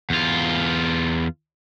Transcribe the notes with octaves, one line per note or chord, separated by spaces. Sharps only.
E2 F4